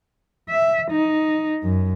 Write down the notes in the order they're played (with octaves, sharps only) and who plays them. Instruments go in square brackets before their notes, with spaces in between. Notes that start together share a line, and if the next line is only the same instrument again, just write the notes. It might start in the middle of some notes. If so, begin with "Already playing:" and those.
[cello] E5
D#4
F#2